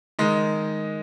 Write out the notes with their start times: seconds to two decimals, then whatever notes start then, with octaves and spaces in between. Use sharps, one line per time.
0.19 D#3 G#3 D#4